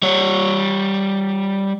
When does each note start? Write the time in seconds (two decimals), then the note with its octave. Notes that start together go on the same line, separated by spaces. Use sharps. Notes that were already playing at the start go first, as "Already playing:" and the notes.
0.03 G3 C#5